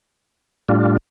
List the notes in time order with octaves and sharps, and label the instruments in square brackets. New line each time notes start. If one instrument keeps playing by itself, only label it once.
[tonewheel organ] A2 G3 D4 F4